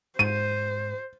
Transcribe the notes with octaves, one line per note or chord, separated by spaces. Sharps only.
G#2 C5 D#7